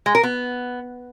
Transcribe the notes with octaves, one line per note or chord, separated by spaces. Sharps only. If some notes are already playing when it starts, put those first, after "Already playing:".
G#3
A#4
B3